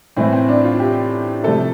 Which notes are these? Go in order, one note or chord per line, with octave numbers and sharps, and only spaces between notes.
A2 E3 A3 C4
C4
D4
F4
G4
C3 F3 A3 A4